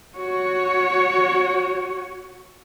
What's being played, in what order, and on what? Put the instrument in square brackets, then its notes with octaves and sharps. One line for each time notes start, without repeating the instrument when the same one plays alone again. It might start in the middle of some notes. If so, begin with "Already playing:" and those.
[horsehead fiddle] F#4 C#5